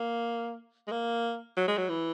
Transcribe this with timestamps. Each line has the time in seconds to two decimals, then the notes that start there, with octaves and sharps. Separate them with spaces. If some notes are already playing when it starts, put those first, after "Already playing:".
Already playing: A#3
0.87 G#3
0.91 A#3
1.57 F#3
1.68 G#3
1.78 F#3
1.89 E3